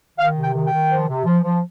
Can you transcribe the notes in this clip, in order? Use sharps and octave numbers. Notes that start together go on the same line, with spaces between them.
D#3 F5
C3
G5
D#3
G5
D#3
F3
C3
F3
F3